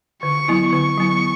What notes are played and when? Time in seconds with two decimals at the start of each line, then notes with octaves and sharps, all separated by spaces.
0.23 D3 C#6
0.48 F#3 B3 E4
0.73 D3 C#6
0.97 F#3 B3 E4